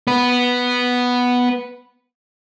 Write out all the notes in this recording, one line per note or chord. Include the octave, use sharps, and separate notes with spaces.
B3 B4